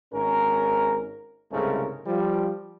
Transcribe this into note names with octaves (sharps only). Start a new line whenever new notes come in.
G#1 G#2 C#4 A#4
C2 G#2 C#3 G#3 A3 A#4
F3 G3